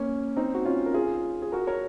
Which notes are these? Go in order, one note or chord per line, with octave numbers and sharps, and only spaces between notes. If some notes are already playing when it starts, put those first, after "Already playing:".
Already playing: A#3 C#4
C4 D#4
F#4
C#4 F4
A#4
F4 G#4
G#4
F#4 A#4
A#4 C#5